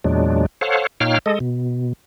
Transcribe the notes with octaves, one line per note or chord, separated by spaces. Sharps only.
E2 A#2 F#3 G#3 D4
A4 C5 C#5 F5 F#5
A#2 D#4 C#5 F5 G5 F6
G#3 A4 D#5
B2